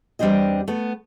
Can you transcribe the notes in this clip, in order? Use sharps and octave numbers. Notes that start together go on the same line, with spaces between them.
E2 G3 C4 D4 G4 D#5
A3 B3